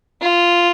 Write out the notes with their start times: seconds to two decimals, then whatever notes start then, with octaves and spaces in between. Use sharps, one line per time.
0.22 F4